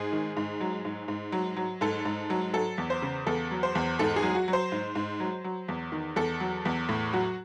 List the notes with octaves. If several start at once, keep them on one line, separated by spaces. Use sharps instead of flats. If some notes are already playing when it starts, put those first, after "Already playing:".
Already playing: G#2 G#4
D#3
G#2
F#3
G#2
G#2
F#3
F#3
G#2 A4
G#2
F#3
F#3 A4
E2
C5
C#3
E2 A4
F#3
C5
E2
G#2 A4
G#4
F#3
F#4
F#3
C5
G#2
G#2
F#3
F#3
E2
D#3
E2 A4
F#3
E2
A2
F#3 F#4